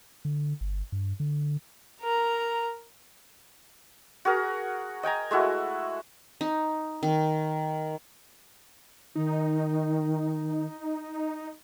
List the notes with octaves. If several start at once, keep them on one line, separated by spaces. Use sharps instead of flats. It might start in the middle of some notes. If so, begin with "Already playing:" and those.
D3
G1
G2
D3
A#4 A#5
F#4 G#4 A#4
D#5 G5 G#5 A#5
G#3 A3 E4 F#4
D#4
D#3
D#3 D#4